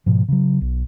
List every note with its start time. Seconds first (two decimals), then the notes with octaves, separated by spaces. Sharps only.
0.06 G#2 B2 F3
0.28 C#3 F#3
0.61 B1